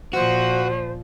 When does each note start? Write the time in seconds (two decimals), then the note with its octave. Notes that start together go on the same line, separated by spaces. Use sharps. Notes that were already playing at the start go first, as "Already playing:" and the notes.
0.13 A#2 F3 F#4 C5